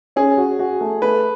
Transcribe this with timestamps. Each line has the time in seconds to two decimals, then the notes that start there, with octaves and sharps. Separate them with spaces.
0.16 C#4 G#4
0.37 F#4
0.59 F#4
0.81 A3
1.02 A3 B4